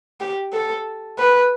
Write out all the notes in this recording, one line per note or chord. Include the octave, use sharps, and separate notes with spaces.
G4
A4
B4